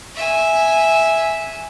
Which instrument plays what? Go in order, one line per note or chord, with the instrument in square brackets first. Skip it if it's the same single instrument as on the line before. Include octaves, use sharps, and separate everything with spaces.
[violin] E5 G#5